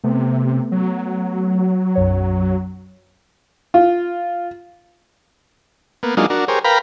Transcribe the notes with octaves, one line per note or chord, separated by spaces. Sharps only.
C3 A3 B3
F#3
B1 F#2 C#5
F4
A#3 B3
F#3 G#3 A#3 D4 D#4 F4
D4 F#4 A#4
G4 G#4 A#4 C5 C#5
A#4 B4 F5 G5 A#5 B5